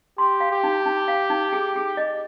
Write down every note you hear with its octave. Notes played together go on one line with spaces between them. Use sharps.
G4 C6
F5
G4
D#4
D#4
F5
D#4
G#4
G#4
D#5